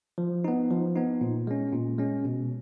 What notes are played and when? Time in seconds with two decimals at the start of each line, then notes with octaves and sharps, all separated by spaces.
0.18 F3
0.44 B3 D#4
0.70 F3
0.96 B3 D#4
1.21 A#2
1.47 G#3 C#4
1.73 A#2
1.98 G#3 C#4
2.25 B2